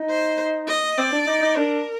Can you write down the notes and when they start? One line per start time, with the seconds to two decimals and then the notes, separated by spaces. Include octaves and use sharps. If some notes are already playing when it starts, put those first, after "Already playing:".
Already playing: D#4
0.10 C5
0.68 D#5
0.98 C4 D5
1.12 D4
1.27 D#4
1.42 D#4
1.57 D4 A#4